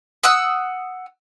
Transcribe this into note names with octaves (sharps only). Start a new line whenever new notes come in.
F#5 D#6 E6 F#6